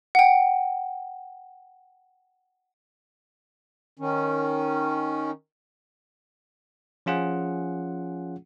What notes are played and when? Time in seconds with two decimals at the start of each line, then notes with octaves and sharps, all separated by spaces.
0.15 F#5 G5
3.99 D#3 C#4
7.06 F3 C#4 F4 G#4 F#5